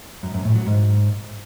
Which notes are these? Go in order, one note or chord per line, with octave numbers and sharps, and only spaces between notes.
F#2
F#2
A2
F#3
G#2